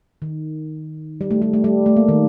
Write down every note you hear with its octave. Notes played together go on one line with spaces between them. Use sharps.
D#3
G3
A3
G3
A3
G3
A3
A#3
D#3